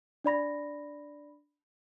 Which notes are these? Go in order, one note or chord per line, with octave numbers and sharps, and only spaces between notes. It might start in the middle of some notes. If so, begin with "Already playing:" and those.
D4 D5 B5 A#6